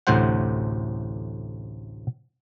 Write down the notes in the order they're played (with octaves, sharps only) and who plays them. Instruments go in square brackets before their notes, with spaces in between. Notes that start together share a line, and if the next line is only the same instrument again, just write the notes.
[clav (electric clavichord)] A1 D2 A2 C3 C5 F#5